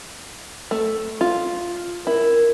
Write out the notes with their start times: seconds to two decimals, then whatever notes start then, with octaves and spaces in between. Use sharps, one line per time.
0.71 A3
1.21 F4
2.07 E4 A#4